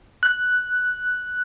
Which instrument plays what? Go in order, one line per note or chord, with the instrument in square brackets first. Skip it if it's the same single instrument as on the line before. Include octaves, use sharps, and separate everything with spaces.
[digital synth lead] F#6